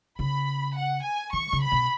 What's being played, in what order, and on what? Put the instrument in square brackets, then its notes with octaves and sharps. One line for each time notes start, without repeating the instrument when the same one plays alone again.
[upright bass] C#3 [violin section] B5
[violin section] F#5
G#5
[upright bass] E3 [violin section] C#6
[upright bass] C#3
[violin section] B5
[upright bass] B2